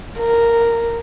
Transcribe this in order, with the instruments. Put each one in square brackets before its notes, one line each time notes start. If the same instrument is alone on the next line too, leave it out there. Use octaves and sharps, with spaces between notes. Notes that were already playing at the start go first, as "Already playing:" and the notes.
[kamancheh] A#4